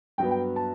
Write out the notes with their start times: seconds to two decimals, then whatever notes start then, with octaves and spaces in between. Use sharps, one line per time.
0.18 G2 F#3 B3 G5
0.31 G5
0.56 A5